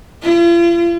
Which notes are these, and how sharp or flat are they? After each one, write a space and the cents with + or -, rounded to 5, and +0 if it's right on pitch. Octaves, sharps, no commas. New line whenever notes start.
F4 -45